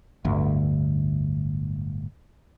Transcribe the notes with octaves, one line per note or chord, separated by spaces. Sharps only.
D1 G1 D2